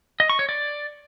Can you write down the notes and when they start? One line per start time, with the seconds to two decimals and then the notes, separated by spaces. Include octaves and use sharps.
0.20 D#5
0.30 C#6
0.39 C#5
0.49 D5